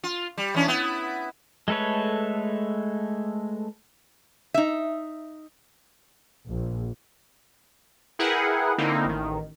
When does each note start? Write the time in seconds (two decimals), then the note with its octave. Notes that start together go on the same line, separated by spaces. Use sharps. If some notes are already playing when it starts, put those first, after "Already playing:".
0.04 F4
0.38 G3
0.54 E3 C#4 D4
0.68 B3 E4
1.68 G#3 A3 A4 B4 C#5
4.54 D#4 E5
6.49 A#1
8.19 E4 G#4 A#4 B4 F#5 G5
8.78 D3 A#3 C4 D#4 E4
9.05 A1 D#3